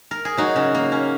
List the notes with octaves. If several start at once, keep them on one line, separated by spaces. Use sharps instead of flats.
A#4
G#4
F#3 D#4 F#4
C#3
A#3
C#4